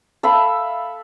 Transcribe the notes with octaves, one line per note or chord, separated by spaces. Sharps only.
A4 E5 F5 B5